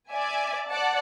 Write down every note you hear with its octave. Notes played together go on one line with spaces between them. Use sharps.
D5 E5 G#5
D5 F#5 A5